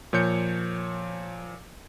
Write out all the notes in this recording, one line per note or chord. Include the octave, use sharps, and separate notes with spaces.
A#2 F3 C#5 G6 C#7